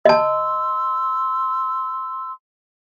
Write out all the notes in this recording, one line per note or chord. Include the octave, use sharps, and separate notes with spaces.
D#5 A5 C6 E6